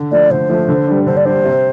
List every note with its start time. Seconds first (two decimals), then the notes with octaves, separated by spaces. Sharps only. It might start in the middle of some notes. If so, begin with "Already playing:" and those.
Already playing: D3
0.11 F3 A3 D5
0.31 D3 C5
0.50 F3 A3
0.68 D3
0.87 G3 D4
1.07 D3 C5
1.17 D5
1.25 G3 D4 C5
1.44 C3